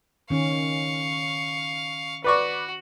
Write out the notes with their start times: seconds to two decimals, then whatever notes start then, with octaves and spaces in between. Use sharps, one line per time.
0.30 D#3 C#4 F5 C#6
2.24 F#4 B4 D5 C#6